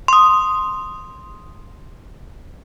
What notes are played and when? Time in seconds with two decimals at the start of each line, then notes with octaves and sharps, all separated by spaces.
0.08 C6 D#6